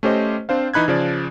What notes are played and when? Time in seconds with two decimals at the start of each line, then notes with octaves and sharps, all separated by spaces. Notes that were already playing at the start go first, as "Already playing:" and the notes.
0.03 A3 C#4 G4 C5 D#5
0.49 C4 D4 C5 F5
0.74 E3 D#4 B5 F#6 G#6
0.88 C#3 F3 D5